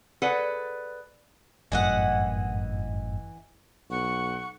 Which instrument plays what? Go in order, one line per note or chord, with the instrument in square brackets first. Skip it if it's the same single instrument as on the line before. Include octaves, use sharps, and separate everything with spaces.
[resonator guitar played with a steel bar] G#4 A4 B4 D5 F#5
[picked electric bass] G1 F#2 A2 [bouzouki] E3 D#5 F#5
[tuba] B1 [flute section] F#5 C#6